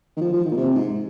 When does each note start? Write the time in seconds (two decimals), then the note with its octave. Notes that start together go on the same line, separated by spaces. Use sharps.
0.17 D#3
0.21 F3
0.33 F3
0.45 D#3
0.51 A#2
0.56 C3
0.75 G#2